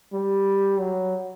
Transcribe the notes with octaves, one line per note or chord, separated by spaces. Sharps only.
G3
F#3